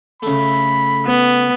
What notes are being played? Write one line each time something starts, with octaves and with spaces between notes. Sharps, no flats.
C#3 A3 B5
B3